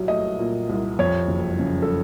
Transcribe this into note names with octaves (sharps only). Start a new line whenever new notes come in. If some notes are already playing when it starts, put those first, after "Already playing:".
Already playing: C2 A#2 F#3
A3 D#5
A#2
C2
F2 C#5
F#1
C#3
A4